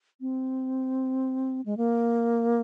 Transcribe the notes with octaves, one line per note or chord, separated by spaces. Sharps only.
C4
G#3
A#3